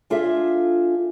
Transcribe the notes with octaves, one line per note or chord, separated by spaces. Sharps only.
D4 F4 G#4 A4 E5